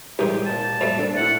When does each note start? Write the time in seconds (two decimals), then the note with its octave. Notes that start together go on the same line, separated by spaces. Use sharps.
0.19 C2 D#3 G#3 G4 D#5 G5
0.46 C#2 A#2 A5
0.81 F2 G3 A3
0.99 D4 A4
1.17 A2 E4 F#5